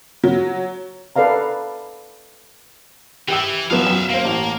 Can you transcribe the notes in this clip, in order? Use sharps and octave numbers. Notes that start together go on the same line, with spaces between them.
F#3
A4 B4 D5 F5 A#5
E3 G4 G5 E6
F3 F#3 B3 E5 F5
F#2
A#3 C5 F5
A1